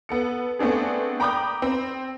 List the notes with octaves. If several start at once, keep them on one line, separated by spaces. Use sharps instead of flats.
B3 A4 C#7
A3 B3 C4 D4 G#4
G5 A#5 B5 D6 D#6 G6
C4